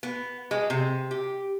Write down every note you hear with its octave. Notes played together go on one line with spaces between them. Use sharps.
B3
G#3
C3
G4